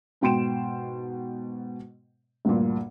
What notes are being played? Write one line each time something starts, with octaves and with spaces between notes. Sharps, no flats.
G#2 B2 G5 C6 D7 E7
D2 G2 A#2